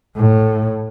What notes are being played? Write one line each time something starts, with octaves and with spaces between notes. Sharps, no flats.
A2